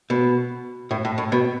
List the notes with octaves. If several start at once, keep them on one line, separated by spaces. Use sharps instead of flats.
B2
A2
A2
A2
B2